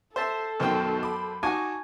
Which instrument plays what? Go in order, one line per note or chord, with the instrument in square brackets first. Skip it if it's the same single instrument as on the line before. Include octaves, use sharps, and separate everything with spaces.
[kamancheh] A4 [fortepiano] C5 E5 A5
[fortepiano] F#2 C5 G5 [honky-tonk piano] B2 D#3
[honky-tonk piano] B5 D6
[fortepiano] D#4 F#4 [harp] G#5 [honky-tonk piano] A5 C#6 D6